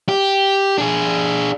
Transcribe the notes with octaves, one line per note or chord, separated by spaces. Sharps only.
G4
D4 G#4